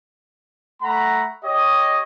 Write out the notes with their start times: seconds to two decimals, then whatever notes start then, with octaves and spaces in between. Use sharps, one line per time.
0.82 A3 F#5 A#5 B5
1.44 G4 C#5 D#5